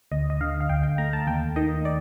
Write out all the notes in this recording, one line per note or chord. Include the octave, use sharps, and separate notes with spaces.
D2 D#5
D#5
D3 F5
F5
D2 G5
G5
A3 A#5
A5
D#2 G5
D#3 D#5
D5